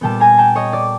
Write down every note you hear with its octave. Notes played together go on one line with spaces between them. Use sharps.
A#2 G3 B3 G5 A5
G#5 A#5
G5 A5
C#5 D#5
D5